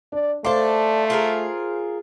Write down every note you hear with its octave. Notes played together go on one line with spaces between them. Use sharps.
D4 D5
A3 D4 A4 C5 F5 C6
F4 G#4 A#4